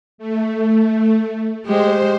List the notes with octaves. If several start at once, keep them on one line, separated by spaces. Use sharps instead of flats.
A3
G#3 G4 C5